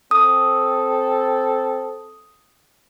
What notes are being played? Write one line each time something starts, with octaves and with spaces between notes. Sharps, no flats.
C4 A4 D#6